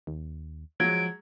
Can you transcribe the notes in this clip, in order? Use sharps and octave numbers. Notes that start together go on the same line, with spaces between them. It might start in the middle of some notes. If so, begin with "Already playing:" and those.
D#2
F3 F#3 G#3 G#6 D7